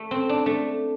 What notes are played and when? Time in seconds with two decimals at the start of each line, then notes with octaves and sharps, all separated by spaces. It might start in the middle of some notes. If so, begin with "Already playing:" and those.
Already playing: A3
0.11 C4
0.29 D4
0.46 A3